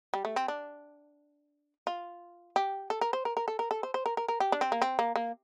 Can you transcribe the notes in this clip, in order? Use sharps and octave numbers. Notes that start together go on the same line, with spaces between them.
G3
A3
C4
D4
F4
G4
A4
A#4
C5
A#4
A#4
A4
A#4
A4
C5
C5
A#4
A#4
A#4
G4
D4
C4
A#3
C4
A#3
A#3